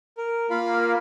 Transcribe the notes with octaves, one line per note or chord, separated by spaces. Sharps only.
A#4
A#3 F4 F5 B5